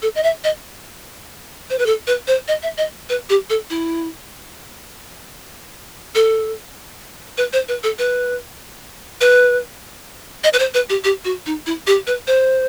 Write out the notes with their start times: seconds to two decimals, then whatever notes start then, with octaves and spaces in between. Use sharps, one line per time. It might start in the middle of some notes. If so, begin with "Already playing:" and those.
0.02 A4
0.15 D#5
0.23 E5
0.44 D#5
1.70 C5
1.79 B4
1.86 A4
2.07 B4
2.27 C5
2.48 D#5
2.63 E5
2.78 D#5
3.09 B4
3.29 G4
3.50 A4
3.70 E4
6.15 A4
7.38 B4
7.53 C5
7.68 B4
7.83 A4
7.99 B4
9.21 B4
10.44 D#5
10.53 B4
10.59 C5
10.74 B4
10.89 G4
11.04 G4
11.25 F#4
11.46 D#4
11.66 E4
11.87 G4
12.07 B4
12.27 C5